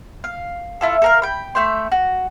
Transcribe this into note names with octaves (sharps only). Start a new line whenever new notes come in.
F5
E4 F4 A4
A4 A#4 F5
G5 B5
A3 E5 G5 C6
F#4